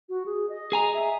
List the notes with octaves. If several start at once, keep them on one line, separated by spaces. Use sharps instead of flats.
F#4
G#4
D#5
G#4 G#5 A#5
E5